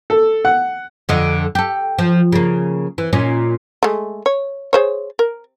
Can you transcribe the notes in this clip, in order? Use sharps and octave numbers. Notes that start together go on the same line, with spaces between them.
A4
F#5
F2 D3 D#5
G4 A4
F3
C#3 A#3
E3
A#2 C#4 D#4
G#3 A3
C#5
G#4 C5 C#5
A#4